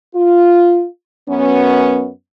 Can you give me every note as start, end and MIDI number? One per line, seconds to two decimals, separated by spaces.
0.15 0.85 65
1.28 2.08 42
1.28 2.08 59
1.28 2.08 61